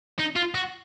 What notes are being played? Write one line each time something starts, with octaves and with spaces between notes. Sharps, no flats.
D#4
F4
F#4